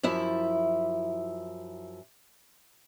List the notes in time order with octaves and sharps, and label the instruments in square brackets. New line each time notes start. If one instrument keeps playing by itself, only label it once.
[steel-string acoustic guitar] F#2 F3 E4 E5